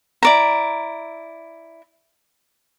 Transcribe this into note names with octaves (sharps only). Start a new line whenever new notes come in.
E4 D5 A#5